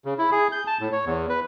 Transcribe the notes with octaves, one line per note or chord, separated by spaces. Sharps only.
C#3
E4
G#4
G6
A5
A2
C#5
E2
B4